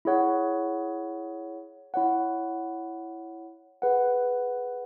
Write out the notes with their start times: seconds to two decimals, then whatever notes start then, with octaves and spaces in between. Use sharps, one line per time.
0.05 E4 G#4 C#5 F#5
1.94 E4 C#5 F#5
3.82 G#4 B4 F#5